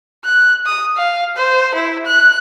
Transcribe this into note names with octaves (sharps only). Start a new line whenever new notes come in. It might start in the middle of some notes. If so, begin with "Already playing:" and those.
F#6
D#6
F5
C5
E4
F#6